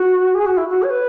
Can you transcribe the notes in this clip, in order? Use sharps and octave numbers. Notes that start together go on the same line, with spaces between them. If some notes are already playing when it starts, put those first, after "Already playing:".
Already playing: F#4
G#4
F#4
E4
F#4
C#5
B4